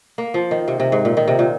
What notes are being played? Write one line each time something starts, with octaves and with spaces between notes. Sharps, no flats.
A#3
F3
D#3
C3
C3
G#2
A#2
D#3
C3
A#2